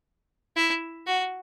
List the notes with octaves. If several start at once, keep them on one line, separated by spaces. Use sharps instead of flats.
E4
F#4